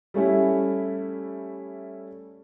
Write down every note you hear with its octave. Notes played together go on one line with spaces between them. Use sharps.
G3 A3 C#4 E4